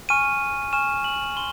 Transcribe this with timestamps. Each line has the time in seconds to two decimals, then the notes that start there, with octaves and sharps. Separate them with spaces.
0.09 G#5 C#6 F6 D#7
0.73 G#5 C#6 F6 E7
1.04 F#7
1.37 C6 G7